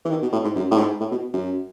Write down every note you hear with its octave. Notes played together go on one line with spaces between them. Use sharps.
E3
D#3
B2
A2
G#2
F#2
A2
G#2
A2
B2
F#2